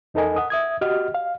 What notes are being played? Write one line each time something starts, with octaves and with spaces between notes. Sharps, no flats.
E2 D#4 A4 A#4 D#5 G#5
F#5 D#6
E5 D#6 G#6
F#4 G4 D#5 F#5 F6
F5